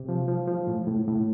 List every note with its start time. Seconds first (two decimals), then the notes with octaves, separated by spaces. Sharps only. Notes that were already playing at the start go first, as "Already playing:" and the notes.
Already playing: C3
0.09 F3
0.28 F3
0.48 F3
0.67 A2
0.87 A2
1.08 A2